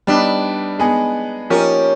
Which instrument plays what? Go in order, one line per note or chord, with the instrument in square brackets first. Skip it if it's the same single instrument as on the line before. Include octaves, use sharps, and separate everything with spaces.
[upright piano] G3 B3 D#4 [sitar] D4
[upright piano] G#3 B3 D#4 G#4
[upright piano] F3 A#3 D#4 G4 A#4 [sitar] C#4